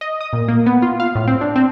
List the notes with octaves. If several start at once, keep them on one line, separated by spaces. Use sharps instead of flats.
D#5
D#6
A#2
A#3
B3
F4
F5
A2
C4
D4
C4